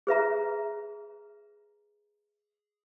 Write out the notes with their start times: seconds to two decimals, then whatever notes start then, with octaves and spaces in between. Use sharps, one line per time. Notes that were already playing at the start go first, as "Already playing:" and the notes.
0.07 G#4 B4 E5 A#5